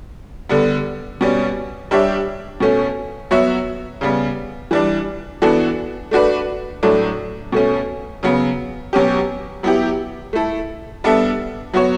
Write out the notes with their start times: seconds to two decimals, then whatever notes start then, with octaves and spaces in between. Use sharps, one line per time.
0.49 D3 G3 B3
1.21 B2 G3 C#4
1.91 G3 D4 G4 C#5 E5
2.60 B2 A3 C#4
3.31 F#3 B3 F#4 C#5 E5
4.01 C#3 G3 B3
4.71 E3 G3 D4
5.42 E3 B3 D4 F#4 A4
6.11 A3 D4 F#4 B4 D5
6.83 A2 F#3 A3 D4
7.52 B2 A3 C#4
8.23 C#3 F#3 B3
8.93 B2 F#3 C#4 G4
9.63 F#3 B3 E4 G4
10.33 A3 E4 A4
11.04 G3 B3 D4 A4 E5
11.73 F#3 B3 F#4 C#5